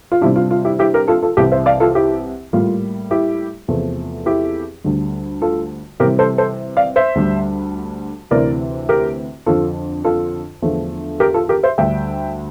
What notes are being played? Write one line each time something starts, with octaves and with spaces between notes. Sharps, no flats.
F4
C3 G3 D4 E4 G4
F4
F4
E4 G4
E4 G4
G4 A#4
F4 A4
F4 A4
C2 C3 E3 E4 G4
C5 E5
D5 F5
F4 A4
E4 G4
A2 G3 A#3 F4
E4 G4
E2 C3 F3 A3
E4 G4
D2 D3 G3
F4 A4
C3 E3 G3 G4 A#4
A4 C5
A4 C5
D5 F5
C5 E5
D2 D3 G3
D2 C3 E3 A#4 D5
G4 A#4
F2 D3 F3 F4 A4
F4 A4
E2 D3 F3 A3
G4 A#4
F4 A4
G4 A#4
C5 E5
D2 D3 G3 D4 E5 G5